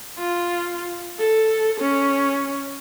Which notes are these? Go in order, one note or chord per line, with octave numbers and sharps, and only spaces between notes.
F4
A4
C#4